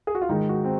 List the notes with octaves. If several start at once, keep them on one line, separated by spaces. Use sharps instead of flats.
G#4
F#4
F4
G#2 D#3 G#3 D#4
F#4
C4